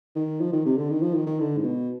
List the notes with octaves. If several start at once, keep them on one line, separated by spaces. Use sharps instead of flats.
D#3
F3
D#3
C3
D3
D#3
F3
D#3
D#3
D3
G#2
B2